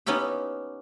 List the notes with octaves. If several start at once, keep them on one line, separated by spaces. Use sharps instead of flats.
B3 C#4 D#4 E4 G4